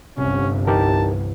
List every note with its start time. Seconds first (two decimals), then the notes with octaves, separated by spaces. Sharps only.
0.18 G1 C2 C3 C#4
0.67 E3 D#4 G4 A#4 A5